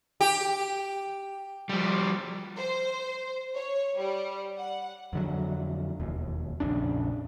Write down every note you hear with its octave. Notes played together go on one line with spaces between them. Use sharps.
G4
F3 G3
C5
C#5
G3
F#5
F2 D3 F#3
E1 D#2
A#1 F2 C#3 D4